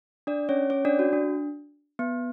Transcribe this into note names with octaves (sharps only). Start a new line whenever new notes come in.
D4 D5
C#4 C#5
C#4 C#5
D4 D5
F#4
D4
B3